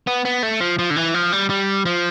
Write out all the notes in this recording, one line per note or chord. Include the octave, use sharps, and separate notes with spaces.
B3
B3
A3
F3
F3
D3
E3
F3
G3
G3
F3